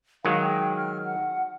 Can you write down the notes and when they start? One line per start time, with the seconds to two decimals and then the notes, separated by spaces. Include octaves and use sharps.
0.25 D#3 F#3 G#3 F5
0.42 G5
0.77 F6
1.05 F#5